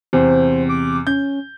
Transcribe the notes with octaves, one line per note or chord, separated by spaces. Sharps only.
E2 C3 C5
D6
C#4 G6